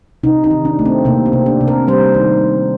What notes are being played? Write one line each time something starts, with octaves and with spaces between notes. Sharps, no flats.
C3 D#4
D#4
D#3
D4
A3
C4
C3 A#3
C4
C3
D4
C3
A#4
G3 C5
D#3